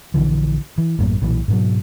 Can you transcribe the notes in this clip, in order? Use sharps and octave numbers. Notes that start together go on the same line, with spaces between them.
A#1 D3 E3 F3
E3
A1 F#2 A2 A#3
B1 A#2 E3
G#2 B2 F#3